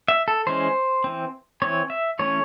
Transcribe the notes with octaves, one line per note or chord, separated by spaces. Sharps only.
E5
A4
E3 G#3 C#4 C5
E3 C4
E3 C4 C#5
E5
E3 A3 C#4 C#5